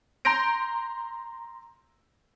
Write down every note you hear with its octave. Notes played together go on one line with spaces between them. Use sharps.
A#5 C6 G6 A#6 D7